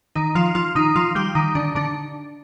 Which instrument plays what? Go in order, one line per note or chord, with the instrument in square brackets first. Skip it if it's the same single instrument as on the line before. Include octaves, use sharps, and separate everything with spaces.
[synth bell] D#3 D#4
F3 F4
F3 F4
D#3 D#4
F3 F4
G3 G4
D#3 D#4
D3 D4
D3 D4